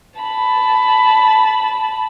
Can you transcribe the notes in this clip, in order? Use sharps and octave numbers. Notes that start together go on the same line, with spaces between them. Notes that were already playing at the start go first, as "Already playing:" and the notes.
A5 B5